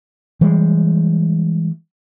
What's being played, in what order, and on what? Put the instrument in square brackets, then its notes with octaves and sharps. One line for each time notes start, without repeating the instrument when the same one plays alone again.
[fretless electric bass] E3 G3 G#3